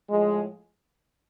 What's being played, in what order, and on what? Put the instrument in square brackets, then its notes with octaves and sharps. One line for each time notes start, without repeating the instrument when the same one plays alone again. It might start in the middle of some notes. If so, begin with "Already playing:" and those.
[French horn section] A2 F3 G#3